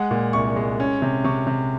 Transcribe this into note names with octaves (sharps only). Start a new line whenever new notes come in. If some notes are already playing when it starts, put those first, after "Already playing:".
Already playing: G#3 F#5
A#2
C2 C#6
G#3
C#4
C3
C3 C#6
C3